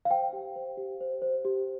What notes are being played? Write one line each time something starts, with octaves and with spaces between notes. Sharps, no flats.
F5
C5 G5
G4
C5
G4
C5
C5
G4